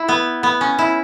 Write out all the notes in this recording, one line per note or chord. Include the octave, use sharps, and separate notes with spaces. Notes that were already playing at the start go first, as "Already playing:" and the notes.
Already playing: E4
B3
B3
C#4
E4